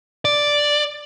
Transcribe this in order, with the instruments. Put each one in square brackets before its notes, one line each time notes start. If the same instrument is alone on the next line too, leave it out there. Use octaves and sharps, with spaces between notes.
[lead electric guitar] D5